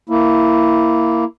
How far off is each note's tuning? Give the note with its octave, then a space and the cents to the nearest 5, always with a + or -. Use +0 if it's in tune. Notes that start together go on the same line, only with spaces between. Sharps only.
A#3 +0 E4 +0